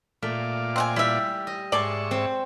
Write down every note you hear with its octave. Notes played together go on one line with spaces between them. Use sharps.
A#2 A3 F4 D5
C4 F#5 G#5
G3 E4 E5
D#5
G#2 D5 E5 G#5 A5 C6 C#6
C4